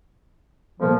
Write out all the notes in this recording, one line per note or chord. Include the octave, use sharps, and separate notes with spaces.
G1 A#2 F3